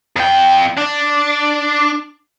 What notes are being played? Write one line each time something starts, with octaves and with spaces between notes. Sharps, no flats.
F2 G5
D4